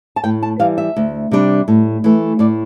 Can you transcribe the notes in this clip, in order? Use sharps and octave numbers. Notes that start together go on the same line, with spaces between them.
A5
A2 G5
A5
E3 G3 F5
E5
D2
C3 G3 D4
A2
E3 A3
A2 D5